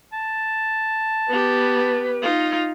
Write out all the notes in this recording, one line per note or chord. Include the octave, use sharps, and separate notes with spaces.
A5
B3 G4 B4
D#4 F4